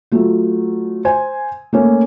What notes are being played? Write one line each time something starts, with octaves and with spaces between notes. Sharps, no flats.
F#3 A3 F4
C5 G#5
A3 A#3 C#4